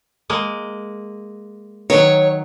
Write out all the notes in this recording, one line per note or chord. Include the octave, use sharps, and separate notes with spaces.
G#3 A#3
D#3 F#3 C#5